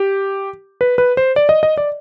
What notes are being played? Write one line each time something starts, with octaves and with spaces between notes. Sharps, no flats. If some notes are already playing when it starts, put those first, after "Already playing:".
Already playing: G4
B4
B4
C5
D5
D#5
D#5
D5